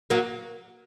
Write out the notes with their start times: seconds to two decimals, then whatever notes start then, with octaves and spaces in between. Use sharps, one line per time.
0.10 F#3 A#3